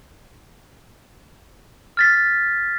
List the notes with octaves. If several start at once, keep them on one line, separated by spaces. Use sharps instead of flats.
F6 A6 B6